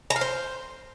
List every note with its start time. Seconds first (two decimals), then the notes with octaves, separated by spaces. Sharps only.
0.10 A#5
0.16 F5
0.21 C5